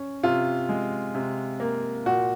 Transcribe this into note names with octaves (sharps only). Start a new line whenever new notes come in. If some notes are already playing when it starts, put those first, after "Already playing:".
Already playing: C#4
C3 F4
G#3
C3
A#3
A#2 F#4